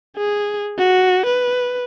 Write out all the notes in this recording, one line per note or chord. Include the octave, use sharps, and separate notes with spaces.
G#4
F#4
B4